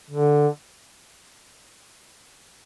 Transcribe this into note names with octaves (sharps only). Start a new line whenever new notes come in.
D3